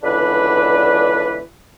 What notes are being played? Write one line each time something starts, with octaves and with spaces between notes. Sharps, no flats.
C#2 B2 D3 E3 D4 B4